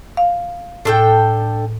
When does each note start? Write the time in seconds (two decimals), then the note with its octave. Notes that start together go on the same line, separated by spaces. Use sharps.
0.17 F5
0.85 A2 D4 A4 G5